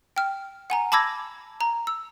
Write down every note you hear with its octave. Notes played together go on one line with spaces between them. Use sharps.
G5 F6
F#5 G#5 A#5
A5 B5 D6 E6 G#6 A#6
A#5
E6